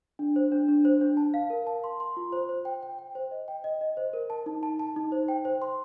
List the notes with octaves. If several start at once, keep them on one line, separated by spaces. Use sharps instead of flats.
D4
C5
D4
D4
C5
D4
A5
F5
A#4
A5
C6
C6
F4
C5
C5
G5
G5
G5
C5
D#5
G5
D#5
D#5
C5
A#4
A5
D#4
A5
A5
D#4
C5
G5
C5
C6